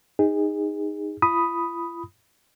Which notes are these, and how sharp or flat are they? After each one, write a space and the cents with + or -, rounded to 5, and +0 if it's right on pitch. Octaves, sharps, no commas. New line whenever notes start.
D#4 +0 G#4 -25
F4 -45 B5 +0 D#6 +0